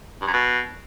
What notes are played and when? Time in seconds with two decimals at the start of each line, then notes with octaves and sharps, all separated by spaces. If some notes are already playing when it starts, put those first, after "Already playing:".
0.21 G2
0.27 F#2
0.33 B2